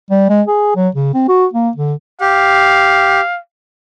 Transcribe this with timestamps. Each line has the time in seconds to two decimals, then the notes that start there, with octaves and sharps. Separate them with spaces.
0.10 G3
0.29 G#3
0.47 G#4
0.76 F#3
0.95 C#3
1.14 C4
1.28 F#4
1.54 A#3
1.76 D3
2.21 G4 F5